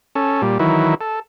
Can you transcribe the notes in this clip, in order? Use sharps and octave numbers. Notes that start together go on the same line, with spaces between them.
C#4 A4
A#2 G3
D#3 E3 F#3 E4
A4